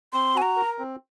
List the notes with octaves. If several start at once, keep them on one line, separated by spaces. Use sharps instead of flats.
C4 C6
F#4 G#5
A#5
A#4
C4